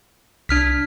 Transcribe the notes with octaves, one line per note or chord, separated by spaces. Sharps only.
C2 D4 F6 B6